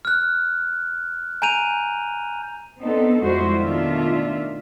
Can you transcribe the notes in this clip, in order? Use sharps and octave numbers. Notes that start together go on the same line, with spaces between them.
F6 F#6
G#5 A#5 G6 D#7 F7
B3 C4 D4 D#4 A4
F2 G3 G#3 E4 F#4 C5
B2 D#3 A3 D4 F4 E5